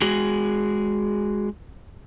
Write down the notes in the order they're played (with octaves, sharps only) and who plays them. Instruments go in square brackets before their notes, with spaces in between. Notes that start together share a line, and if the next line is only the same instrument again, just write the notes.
[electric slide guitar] G#3 F#4 G#4